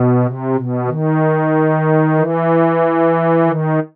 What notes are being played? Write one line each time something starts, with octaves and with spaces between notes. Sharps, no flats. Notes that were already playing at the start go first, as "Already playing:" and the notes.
Already playing: B2
C3
B2
D#3
E3
D#3